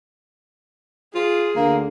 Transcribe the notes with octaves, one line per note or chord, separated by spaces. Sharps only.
F4 G#4
D2 D3 A#3